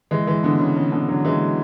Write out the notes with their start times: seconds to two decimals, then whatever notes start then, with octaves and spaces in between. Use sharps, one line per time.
0.11 E3 G#3
0.27 E3 G#3
0.43 B2 D3
0.59 C#3
0.76 C#3
0.92 B2 D3
1.09 D3 F#3
1.25 E3 G#3